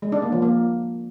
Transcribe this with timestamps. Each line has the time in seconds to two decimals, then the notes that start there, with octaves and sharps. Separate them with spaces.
0.02 G#3
0.12 D4
0.22 A#3
0.32 F3
0.42 A#3